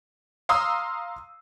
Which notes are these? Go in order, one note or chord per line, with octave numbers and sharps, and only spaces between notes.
F5 A#5 C6 D#6 E6